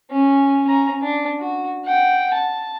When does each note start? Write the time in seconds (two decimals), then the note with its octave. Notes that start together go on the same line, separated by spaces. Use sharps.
0.10 C#4
0.67 C#4 A#5
1.02 D4
1.39 F#4
1.85 F#5 G5
2.34 A5